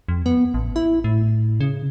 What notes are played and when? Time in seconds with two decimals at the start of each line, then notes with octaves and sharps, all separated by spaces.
0.08 F2
0.26 B3
0.54 A1
0.76 E4
1.04 A2
1.61 C#3